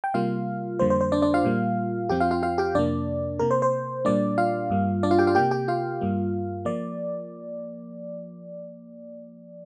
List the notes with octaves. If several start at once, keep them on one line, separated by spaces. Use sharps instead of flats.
G5
C3 G3 A#3 F4 F5
F2 D3 G3 A#3 C5
C5
C5
D4 D5
D4 D5
F4 F5
A#2 G3 A#3
F2 F3 C4 G4 G5
F4 F5
F4 F5
F4 F5
G4 G5
F2 C3 A#3 D4 D5
C3 A#3 A#4
C5
C5
A#2 G3 A#3 D4 D5
F4 F5
G2 G3 A#3
D4 D5
F4 F5
G4 G5
F4 F5
C3 A#3 G4 G5
G4 G5
F4 F5
G2 G3 A#3
F3 A#3 D5